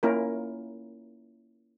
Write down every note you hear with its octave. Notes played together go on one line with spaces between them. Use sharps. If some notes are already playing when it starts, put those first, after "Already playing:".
A#3 C#4 E4 F4 A#4